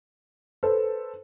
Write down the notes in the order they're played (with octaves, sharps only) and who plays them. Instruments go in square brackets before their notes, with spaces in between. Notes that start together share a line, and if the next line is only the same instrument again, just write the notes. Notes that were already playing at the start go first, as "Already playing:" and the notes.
[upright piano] A4 B4 C5